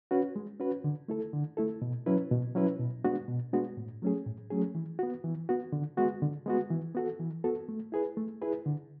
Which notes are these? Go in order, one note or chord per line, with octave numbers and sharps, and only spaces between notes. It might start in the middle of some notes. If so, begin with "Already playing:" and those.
C#4 F#4 B4
G#3
C#4 F#4 B4
D3
A3 E4 A4
D3
A3 E4 A4
B2
F#3 C#4 E4 B4
B2
F#3 C#4 E4 B4
B2
G#3 B3 D4 F#4
B2
G#3 B3 D4 F#4
A2
F#3 A3 C#4 G#4
A2
F#3 A3 C#4 G#4
E3
B3 F#4
E3
B3 F#4
D3
G#3 B3 F#4
D3
G#3 B3 F#4
E3
B3 F#4 A4
E3
B3 F#4 A4
A3
E4 G#4 B4
A3
E4 G#4 B4
D3